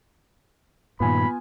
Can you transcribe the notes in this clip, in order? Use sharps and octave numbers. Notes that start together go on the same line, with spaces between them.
G2 A#2 D#3 B3 F4 G#5 B5